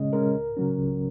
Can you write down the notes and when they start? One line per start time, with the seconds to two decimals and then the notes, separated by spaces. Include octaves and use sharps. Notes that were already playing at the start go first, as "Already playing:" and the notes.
Already playing: C#3 G#3 C#4 D#5
0.13 G#3 C#4 A#4
0.35 C#2
0.57 C#3 F#3 C#4
0.78 C#2